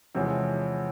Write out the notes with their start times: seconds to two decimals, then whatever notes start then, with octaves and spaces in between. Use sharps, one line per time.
0.15 E2 C3 F3 G#3 C#4